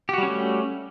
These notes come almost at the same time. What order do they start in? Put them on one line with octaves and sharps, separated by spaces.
G4 F#4 G3 C#4 A3